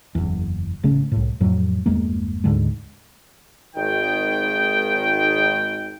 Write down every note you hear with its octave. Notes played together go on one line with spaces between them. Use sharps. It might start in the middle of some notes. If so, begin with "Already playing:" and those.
F#1 E2
A1 C#3 A3 C#4
C2 A2
F2 A2 F#3
G1 E2 G#3 A#3
D2 G#2 D3 G#3
G#1 D#3 G5